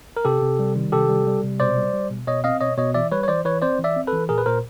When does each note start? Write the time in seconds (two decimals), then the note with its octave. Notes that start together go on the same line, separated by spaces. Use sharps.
0.17 A#4
0.25 C3 G4 A4
0.41 C3
0.59 G3
0.76 D#3
0.92 C3 G4 A4
1.09 G3
1.27 G3
1.43 C3
1.60 B2 C5 D5
1.77 G3
1.94 G3
2.10 B2
2.27 B2 C#5 D#5
2.44 C4 D#5 F5
2.61 B2 C#5 D#5
2.78 B2 C#5 D#5
2.94 E3 D5 E5
3.11 G3 B4 C#5
3.23 C#5
3.28 E3 C5 D5
3.45 E3 B4 C#5
3.62 C4 C5 D5
3.78 E3
3.84 D5 E5
3.96 C4
4.07 A4 B4
4.13 E3
4.29 A#2 G#4 A#4
4.38 B4
4.46 A#2 A#4 C5